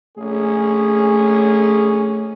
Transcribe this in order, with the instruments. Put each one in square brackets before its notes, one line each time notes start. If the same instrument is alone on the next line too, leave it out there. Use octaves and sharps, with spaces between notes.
[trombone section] A#1 C#4 G#4 [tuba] A3